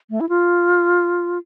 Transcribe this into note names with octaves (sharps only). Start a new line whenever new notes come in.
A3
E4
F4